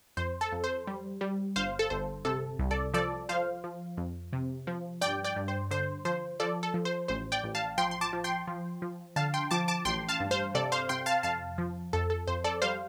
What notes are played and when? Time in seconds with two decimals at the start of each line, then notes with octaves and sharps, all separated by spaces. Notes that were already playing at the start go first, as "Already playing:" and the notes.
0.17 F2 C5
0.41 A4
0.52 F2
0.64 C5
0.87 G3
1.21 G3
1.56 G1 C5 F5
1.79 A4
1.90 G1 C5
2.25 C3 A4
2.59 C2
2.71 A4 D5
2.94 F3 A4 D5
3.29 F3 C5 F5
3.64 F3
3.97 F2
4.33 C3
4.67 F3
5.01 G2 D5 G5
5.24 D5 G5
5.36 G2
5.48 C5
5.71 D3 C5
6.05 F3 C5
6.40 F3 A4 D5
6.63 A4
6.74 F3
6.85 C5
7.08 A1 C5
7.32 D5 G5
7.44 A1
7.55 F5 A5
7.78 F3 G5 C6
7.91 C6
8.01 A5 D6
8.13 F3
8.24 G5 C6
8.47 F3
8.82 F3
9.16 D3 F5 A5
9.34 G5 C6
9.51 F3 A5 D6
9.68 A5 D6
9.85 A1 G5 C6
10.09 F5 A5
10.20 G2
10.31 C5 F5
10.55 C3 A4 D5
10.72 C5 F5
10.89 C3 G5 C6
11.06 F5 A5
11.23 F2 F5 A5
11.58 F3
11.93 F2 A4
12.10 A4
12.27 F2 C5
12.44 A4 D5
12.62 G3 C5 F5